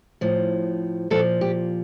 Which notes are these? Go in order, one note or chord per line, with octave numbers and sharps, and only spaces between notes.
A2 F3
A#2 F3 A4
G4